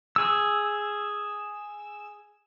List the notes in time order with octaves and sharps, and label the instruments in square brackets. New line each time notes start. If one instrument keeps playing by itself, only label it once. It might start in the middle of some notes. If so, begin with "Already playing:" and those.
[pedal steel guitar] G#4 E6